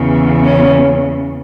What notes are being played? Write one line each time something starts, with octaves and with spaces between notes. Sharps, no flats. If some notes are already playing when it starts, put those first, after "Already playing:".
Already playing: E2 C#3 E3
C#4